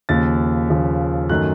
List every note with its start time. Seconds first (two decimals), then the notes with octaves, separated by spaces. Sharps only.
0.09 D#2 C#3 F3 A6
0.70 D#2 C#3 F3
1.29 F#2 D#3 A3 F#6